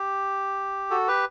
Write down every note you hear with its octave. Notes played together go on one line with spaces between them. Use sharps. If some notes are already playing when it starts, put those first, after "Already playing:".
Already playing: G4
F#4 A4
G4 B4